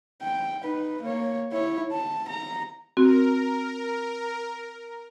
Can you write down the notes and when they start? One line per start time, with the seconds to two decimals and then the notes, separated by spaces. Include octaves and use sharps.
0.22 G5
0.60 D#4 B4
1.02 A#3 C#5
1.52 E4 C#5
1.92 A5
2.28 A#5
2.97 C4 F#4 A#4